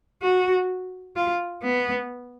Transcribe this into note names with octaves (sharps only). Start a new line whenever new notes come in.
F#4
F4
B3